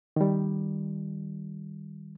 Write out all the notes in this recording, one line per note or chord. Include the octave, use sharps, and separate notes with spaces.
D#3 G3